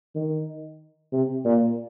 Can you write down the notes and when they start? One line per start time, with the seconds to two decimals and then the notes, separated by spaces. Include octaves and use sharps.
0.15 D#3
1.13 C3
1.45 A#2